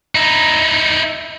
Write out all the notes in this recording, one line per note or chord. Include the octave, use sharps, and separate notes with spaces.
D#4 E4